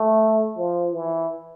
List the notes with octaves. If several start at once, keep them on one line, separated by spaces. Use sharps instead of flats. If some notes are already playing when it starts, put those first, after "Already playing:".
Already playing: A3
F3
E3